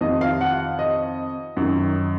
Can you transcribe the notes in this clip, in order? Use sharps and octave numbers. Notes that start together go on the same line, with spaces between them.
F2 D#3 D#5
F5
F#5
D#5
F#2 D#3